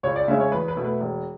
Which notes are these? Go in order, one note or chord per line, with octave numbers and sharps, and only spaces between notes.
C#2 C#5
D5
C#3 G#3 C#4 E4 E5
C#5
E2 B4
B4
B2 A3 E4
B4
E1